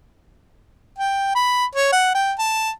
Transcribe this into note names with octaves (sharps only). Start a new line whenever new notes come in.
G5
B5
C#5
F#5
G5
A5